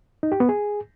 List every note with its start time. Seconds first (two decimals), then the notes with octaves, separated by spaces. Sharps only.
0.23 D#4
0.32 G4
0.40 B3
0.49 G#4